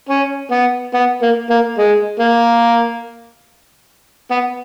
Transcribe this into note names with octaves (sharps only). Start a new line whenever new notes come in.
C#4
B3
B3
A#3
A#3
G#3
A#3
B3